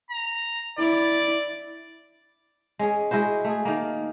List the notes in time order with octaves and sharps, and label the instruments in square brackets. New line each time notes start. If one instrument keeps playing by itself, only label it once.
[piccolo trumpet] A#5
[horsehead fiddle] E4 [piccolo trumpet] D5
[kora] G#3 C#4 G#4
G#3 E4 F#4 C5
A3 G#4
D#3 A#3